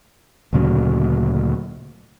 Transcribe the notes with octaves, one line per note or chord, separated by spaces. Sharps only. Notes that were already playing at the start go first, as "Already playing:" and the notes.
D2 A#2 C#3 F#3